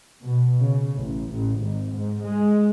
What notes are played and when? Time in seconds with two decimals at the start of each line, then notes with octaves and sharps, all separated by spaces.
0.24 B2
0.60 C#3
0.94 A1
1.29 A1
1.59 G#1
1.93 G#2
2.23 G#3